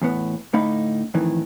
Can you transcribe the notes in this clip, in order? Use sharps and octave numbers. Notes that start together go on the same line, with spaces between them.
E2 A2 B3
A2 D3 A3 D#4 F5 B5
F2 A2 D#3 E3